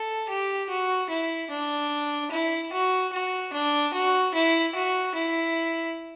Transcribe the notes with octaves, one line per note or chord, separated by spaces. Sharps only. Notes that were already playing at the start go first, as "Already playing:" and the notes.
Already playing: A4
G4
F#4
E4
D4
E4
F#4
F#4
D4
F#4
E4
F#4
E4